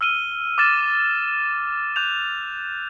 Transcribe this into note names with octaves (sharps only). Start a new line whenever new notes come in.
E6 F6 D#7 G7
D6 E6 F6 A6 E7
D6 F#6 G6 F7